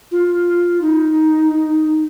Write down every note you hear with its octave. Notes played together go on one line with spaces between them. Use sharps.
F4
D#4